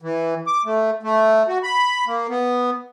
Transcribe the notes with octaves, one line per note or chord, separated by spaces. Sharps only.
E3
D6
A3
A3
F#4
B5
A#3
B3